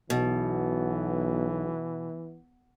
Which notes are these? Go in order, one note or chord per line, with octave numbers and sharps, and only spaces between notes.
B1 B2 E3